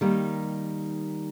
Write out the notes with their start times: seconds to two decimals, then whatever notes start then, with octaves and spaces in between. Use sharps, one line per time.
0.01 D#3 G3 A#3 D#4